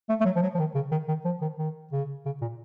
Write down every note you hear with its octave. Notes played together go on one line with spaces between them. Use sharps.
A3
A3
F#3
F3
F#3
F3
D#3
C#3
D#3
D#3
F3
D#3
D#3
C#3
C#3
A#2